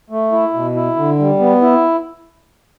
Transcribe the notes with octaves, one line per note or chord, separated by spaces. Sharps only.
A3
E4
B2
E4
D3
G3
B3
E4